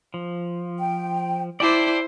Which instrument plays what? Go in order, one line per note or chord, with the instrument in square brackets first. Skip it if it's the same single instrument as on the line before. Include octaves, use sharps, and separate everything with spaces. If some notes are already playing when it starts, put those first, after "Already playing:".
[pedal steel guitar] F3
[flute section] G5
[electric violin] E4 C5 [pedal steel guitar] D5 G5 A5 [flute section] D6